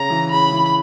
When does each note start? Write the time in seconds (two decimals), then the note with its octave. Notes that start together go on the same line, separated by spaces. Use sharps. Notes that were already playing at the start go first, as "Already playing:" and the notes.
Already playing: C#3 A#5
0.10 E3
0.31 C#3 B5
0.52 E3